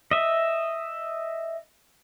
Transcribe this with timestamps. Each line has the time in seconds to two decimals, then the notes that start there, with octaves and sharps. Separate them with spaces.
0.11 D#5 E5